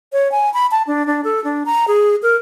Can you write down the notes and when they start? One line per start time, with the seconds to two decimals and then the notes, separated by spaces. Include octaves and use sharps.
0.13 C#5
0.32 G#5
0.54 B5
0.71 A5
0.87 D4
1.07 D4
1.24 A4
1.44 D4
1.66 A#5
1.88 G#4
2.23 A#4